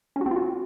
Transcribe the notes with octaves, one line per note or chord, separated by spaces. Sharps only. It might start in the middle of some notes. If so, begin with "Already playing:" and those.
C#4
F#4
C4
F4
F#4